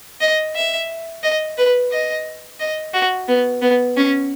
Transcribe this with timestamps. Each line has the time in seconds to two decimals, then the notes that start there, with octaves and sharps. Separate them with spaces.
0.21 D#5
0.56 E5
1.23 D#5
1.58 B4
1.92 D#5
2.60 D#5
2.94 F#4
3.28 B3
3.62 B3
3.96 C#4